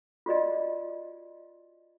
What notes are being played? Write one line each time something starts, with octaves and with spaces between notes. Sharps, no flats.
F4 F#4 D5 D#5